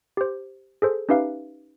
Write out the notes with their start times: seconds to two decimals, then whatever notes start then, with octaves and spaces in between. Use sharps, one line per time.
0.17 G4 C5
0.82 G#4 A4 C5
1.09 C#4 D#4 G4 B4 E5 F5